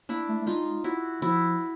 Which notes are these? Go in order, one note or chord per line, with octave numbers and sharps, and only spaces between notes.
A#3 D4 E4
A3
A3
G#3 D#4 F4
E4 F#4
F3 E4 F#4